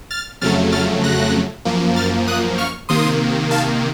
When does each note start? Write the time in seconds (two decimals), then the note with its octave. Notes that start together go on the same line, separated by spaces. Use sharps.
0.11 F6 A6
0.41 F2 C#3 F#3 A3 F6 A6
0.72 F6 A6
1.04 F#6 A#6
1.65 F#2 F3 A#3
1.96 F6 A6
2.27 D#6 F#6
2.58 C#6 F6
2.89 C3 D#3 A#3 C6 D#6
3.51 F5 A5